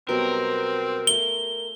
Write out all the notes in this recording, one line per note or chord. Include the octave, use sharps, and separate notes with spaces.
B2 F#3 G3 C4 A#4
A3 F5 G7